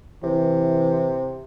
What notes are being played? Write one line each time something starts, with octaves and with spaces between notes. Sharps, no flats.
C3 E3